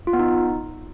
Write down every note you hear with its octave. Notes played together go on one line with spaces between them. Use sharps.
F4
B3
D#4